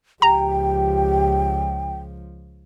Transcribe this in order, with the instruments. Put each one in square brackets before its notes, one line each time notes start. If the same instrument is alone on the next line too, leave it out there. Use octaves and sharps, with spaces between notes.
[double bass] C#2 F3 [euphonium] G4 [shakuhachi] G5 [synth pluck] A#5